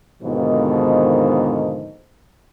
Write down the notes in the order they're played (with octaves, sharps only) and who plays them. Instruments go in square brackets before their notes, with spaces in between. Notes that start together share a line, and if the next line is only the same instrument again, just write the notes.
[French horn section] D#2 G#2 B2 D3 D#3 F3